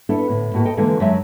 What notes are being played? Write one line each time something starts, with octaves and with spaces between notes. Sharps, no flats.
B3 D4 E4 A4
A2 D3
A2 A#3 F#4
A4 D#5 G5
D3 E3 G#3 A#3 F4 A4
F#2 D3 F#3 G#3 E5